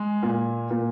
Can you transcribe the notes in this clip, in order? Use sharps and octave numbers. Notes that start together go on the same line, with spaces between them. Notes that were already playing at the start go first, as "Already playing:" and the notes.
Already playing: G#3
A#2
A#2